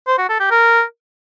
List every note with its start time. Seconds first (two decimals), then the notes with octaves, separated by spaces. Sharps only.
0.07 C5
0.18 F#4
0.29 A4
0.40 G4
0.51 A#4